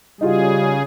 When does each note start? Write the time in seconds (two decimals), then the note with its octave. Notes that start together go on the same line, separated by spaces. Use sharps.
0.21 C#3 G3 D#4 F4 F#4 G#4